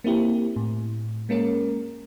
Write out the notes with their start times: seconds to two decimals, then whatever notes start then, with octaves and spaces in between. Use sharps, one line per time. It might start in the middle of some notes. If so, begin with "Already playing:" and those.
0.04 A#3 C4 E4 G4
0.56 A2
1.29 G#3 A#3 C#4 A#4